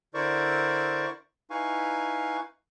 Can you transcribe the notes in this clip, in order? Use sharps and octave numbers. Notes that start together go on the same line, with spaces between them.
D3 E4 A#4 C5 D5 C#6
D#4 E4 B4 F5 G#5 C#6